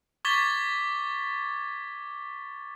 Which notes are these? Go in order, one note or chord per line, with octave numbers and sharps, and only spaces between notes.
C#6 D6 G#6 A6 B6 G7